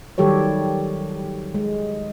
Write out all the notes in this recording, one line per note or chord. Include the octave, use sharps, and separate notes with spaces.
D#3 F#3 G3 G4 A4 C#5
G#3